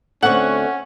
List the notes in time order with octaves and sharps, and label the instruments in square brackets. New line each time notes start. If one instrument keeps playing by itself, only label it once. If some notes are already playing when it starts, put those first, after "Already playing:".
[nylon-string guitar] D2 C4 A4 [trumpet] C#4 [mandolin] F#5 C#6